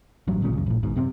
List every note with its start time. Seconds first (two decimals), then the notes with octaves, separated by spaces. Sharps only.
0.28 A1 G2 F#3
0.41 G#1 C#2 A#2 C#3
0.53 C#2 F#2
0.66 A#1 A2
0.83 G#1 G#2 B2
0.96 F#2 C3 F#3 C4